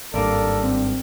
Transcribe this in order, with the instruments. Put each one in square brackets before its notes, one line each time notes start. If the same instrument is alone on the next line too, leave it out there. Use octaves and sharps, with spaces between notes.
[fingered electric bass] G#1 G2 [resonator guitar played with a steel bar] A#3 A#4 D5 [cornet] A4
[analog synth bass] C4